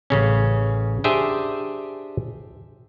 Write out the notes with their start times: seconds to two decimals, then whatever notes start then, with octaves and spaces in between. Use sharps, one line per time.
0.10 A1 C#3 C#4
1.04 D4 G4 G#4 C5 E5 G5